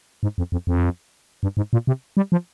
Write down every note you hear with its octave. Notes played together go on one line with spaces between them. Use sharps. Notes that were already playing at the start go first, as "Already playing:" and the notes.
G#2
F2
F2
F2
G2
G#2
A#2
C3
G3
F3